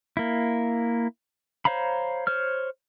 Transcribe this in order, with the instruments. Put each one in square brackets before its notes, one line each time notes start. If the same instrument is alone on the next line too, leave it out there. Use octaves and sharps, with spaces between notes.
[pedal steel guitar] A#3 E4
C5 C#5 F5 A#5 B5
C5 C#5 F6